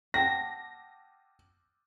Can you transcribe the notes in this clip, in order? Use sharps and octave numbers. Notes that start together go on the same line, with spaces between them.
F#5 G5 A5 A#6